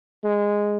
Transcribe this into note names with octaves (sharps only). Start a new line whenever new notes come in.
G#3